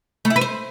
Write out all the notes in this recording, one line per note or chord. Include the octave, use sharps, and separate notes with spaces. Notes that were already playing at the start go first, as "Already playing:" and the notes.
A3
E4
B4
C5